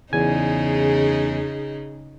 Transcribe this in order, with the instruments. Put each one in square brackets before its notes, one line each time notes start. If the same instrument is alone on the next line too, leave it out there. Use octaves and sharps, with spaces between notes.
[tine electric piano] E2 G#5 [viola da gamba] C#3 D#4 G#4